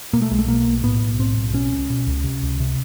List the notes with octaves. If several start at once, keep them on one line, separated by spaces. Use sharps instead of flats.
B2 A#3
A3
B1 G#3
A3
B2 A#3
B1
A2 B3
B1
A2 C4
B1
B2 C#4
C#2
B2
C#2
C3
C#2
C3